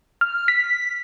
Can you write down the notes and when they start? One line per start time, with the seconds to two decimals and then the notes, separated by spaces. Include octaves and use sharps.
0.21 F6
0.48 B6